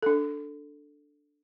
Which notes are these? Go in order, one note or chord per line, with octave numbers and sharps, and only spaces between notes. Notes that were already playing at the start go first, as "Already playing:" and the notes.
D4 A4